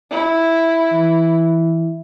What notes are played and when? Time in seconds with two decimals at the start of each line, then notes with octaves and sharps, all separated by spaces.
0.11 E4
0.92 E3